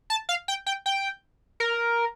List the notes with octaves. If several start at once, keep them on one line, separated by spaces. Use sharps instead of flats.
A5
F5
G5
G5
G5
A#4